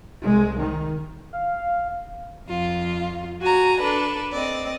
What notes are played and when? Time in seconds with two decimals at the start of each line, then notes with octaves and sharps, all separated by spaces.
0.22 C2 G#3
0.57 D#3
1.33 F5
2.47 F2 F4
3.40 F#4 G#5 A#5
3.80 D4 A4 B4
4.34 C4 D5 D#5